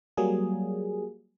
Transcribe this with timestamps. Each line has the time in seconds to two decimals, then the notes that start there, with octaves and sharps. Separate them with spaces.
0.17 F#3 G3 A#3 G#4